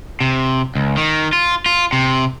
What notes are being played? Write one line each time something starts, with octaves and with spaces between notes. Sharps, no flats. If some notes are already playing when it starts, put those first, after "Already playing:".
C3
C#2
D#3
F4
F4
C3